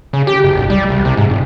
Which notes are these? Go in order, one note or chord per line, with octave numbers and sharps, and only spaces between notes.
C#3
G4
F#1
B1
G3
C2
C3
G#2
F1